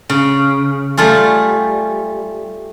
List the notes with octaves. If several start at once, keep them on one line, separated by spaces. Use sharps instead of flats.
C#3
G3 A3 F4 G#4